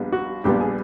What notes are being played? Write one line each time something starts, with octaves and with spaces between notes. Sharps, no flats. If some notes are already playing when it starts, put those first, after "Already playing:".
Already playing: A#1 A#2 G3 B3
F#4
A#1 A#2 G3 B3 G4
G#4